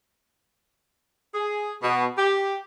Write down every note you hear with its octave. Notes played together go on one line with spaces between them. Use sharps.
G#4
B2
G4